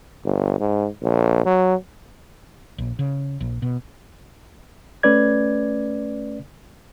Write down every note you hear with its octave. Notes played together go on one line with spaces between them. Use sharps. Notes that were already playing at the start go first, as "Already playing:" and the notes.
G1
G#2
A#1
F#3
A#1
C#3
A#1
B2
A3 C#4 B4 D5 G#6